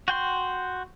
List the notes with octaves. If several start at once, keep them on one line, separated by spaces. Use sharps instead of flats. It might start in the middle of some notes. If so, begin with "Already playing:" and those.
F#4 G5 C6